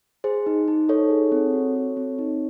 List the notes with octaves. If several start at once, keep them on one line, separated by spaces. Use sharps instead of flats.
G#4 C5
D#4
D#4
D#4 A4 C#5
G#4
C4
F#4
A4
C4
D#4